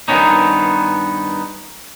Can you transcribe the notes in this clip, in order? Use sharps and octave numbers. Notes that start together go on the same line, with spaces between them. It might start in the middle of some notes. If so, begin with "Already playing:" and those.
G2 D#3 F3 B3 C#4 D#4